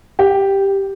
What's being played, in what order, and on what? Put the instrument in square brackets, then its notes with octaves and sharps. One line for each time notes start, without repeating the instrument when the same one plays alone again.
[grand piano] G4